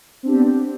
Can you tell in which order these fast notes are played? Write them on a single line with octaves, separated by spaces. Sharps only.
C4 D4 G4 B3